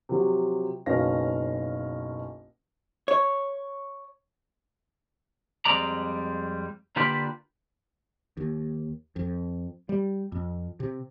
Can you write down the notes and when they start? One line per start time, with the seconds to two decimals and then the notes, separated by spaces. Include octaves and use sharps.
0.09 C3 F3 F#3
0.86 F#1 B1 C#4 F5 A#6
3.08 C#5
5.65 F2 G#2 G3 G#3 D5 A#5
6.96 D3 A#3 F4 G4 B4 D5
8.37 D#2
9.16 F2
9.89 G3
10.32 F2
10.80 C3